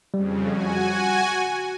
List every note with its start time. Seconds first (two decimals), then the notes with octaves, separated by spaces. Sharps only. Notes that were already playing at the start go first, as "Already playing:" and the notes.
0.14 F2 C#3 G3
0.50 F#4 G#5